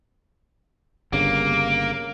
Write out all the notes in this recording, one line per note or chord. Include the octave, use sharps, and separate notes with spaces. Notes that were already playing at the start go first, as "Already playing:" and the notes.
G1 G2 C#3 A#3 D7